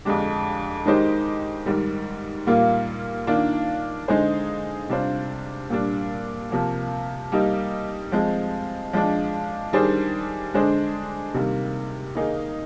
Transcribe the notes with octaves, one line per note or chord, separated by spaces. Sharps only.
F2 D3 G#3 D4 G4
D#3 G#3 D#4 G4 C5
G#2 D#3 G3
A#2 G3 A#3 F4
D#3 A#3 D4 F4
D3 G#3 D#4 G#4 C5
C3 G3 D4 F4 C5
A#2 G3 D4
C3 F3 A#3
G3 A#3 D#4 G4
F3 G#3 C4
F3 G#3 D4
D#3 G3 D4 G#4 C5
D3 G#3 D4 G#4 C5
C3 D#3 G3 A#3
D#3 A#3 D#4 G#4